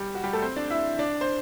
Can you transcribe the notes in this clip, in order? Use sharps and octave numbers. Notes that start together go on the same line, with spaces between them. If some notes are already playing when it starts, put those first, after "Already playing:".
Already playing: G3 G4
F#4
G3 G4
A3 A4
C4 C5
D4 D5
E4 E5
D4 D5
C5